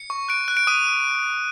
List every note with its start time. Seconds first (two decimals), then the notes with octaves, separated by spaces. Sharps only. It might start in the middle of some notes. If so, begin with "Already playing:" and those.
Already playing: C#7
0.10 C#6
0.28 F#6 D7
0.48 F#6
0.57 D7
0.67 D#6 D#7
0.87 D#6